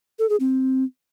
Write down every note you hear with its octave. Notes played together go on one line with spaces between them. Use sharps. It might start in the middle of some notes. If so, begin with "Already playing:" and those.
A4
G#4
C4